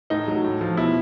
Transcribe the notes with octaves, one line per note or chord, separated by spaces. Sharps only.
A2 D#4
F#3
A2
F3
B2 E4